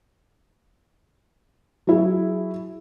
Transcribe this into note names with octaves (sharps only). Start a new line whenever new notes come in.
F#3 E4 G#4